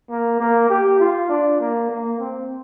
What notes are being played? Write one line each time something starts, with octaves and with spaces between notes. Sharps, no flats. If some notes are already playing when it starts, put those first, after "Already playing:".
A#3
A#3
G4
F4
D4
A#3
A#3
C4